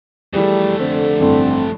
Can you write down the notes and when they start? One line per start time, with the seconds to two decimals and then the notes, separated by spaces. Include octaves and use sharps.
0.33 F2 E3 G3 A3 G#4
0.79 D3 C4
1.20 A1 G2 C4 A4